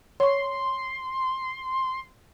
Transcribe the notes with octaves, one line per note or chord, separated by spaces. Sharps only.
C#5 C6 C#6